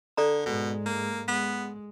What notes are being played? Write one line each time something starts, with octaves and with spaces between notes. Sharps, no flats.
D3 A4 D5 A#5
G#2 B2 G#3
A#3
G#3 B3